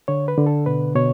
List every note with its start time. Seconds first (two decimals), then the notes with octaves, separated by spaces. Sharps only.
0.08 D3 C#5
0.28 B4
0.38 D3
0.47 A4
0.66 B2 B4
0.95 B2 C#5